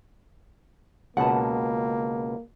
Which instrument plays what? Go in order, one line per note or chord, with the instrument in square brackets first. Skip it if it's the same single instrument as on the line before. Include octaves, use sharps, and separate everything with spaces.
[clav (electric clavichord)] C#2 B2 [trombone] A#3 [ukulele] F#5 A5